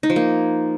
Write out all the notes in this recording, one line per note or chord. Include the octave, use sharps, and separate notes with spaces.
D#4
F3
A#3